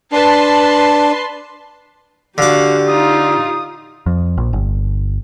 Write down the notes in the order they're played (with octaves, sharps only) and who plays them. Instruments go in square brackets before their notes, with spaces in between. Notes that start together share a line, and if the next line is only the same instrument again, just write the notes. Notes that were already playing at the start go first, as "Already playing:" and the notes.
[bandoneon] D4 [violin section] B4 A5 C6
[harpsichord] D3 D6 [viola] F#4 [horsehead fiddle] G4 [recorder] F5
[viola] D#4 F4 [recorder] D#6
[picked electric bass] F2
A#1
G1